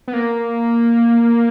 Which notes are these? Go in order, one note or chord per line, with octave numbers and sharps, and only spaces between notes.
B3
A#3